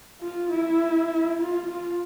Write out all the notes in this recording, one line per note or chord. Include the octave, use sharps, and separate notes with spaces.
F4
E4
F4
F4